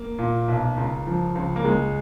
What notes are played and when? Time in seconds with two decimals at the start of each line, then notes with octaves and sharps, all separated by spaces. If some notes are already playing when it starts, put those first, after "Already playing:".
Already playing: A#3
0.19 A#2
0.48 B1
0.77 C#2
1.07 F3
1.35 C#2
1.56 A#3
1.64 C#2 G#3